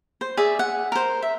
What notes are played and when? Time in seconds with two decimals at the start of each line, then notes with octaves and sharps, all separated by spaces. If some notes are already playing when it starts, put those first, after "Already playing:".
0.21 C5
0.37 G#4 D5 E5
0.59 F#5
0.92 A#4 C5
1.23 E5